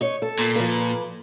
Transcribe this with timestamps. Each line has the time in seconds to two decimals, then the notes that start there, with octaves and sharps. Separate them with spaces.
0.01 D#4 C#5
0.22 A4
0.38 A#2
0.56 F3 B4